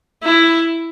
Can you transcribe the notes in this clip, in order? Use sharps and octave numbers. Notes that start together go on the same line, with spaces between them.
E4